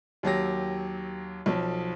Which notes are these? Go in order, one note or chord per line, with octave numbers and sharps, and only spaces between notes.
D#2 F#3 G4 A#6
B1 F3